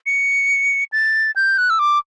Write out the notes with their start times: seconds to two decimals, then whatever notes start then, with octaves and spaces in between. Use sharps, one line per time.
0.06 C#7
0.92 A6
1.36 G6
1.58 F#6
1.70 E6
1.79 D6